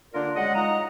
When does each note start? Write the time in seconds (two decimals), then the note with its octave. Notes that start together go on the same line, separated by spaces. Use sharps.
0.14 D3 A#3 D4 F4 A#4 D5
0.36 F#2 C#3 G#3 D#5 F#5
0.55 D#4 F4 D#5 F#5 A#5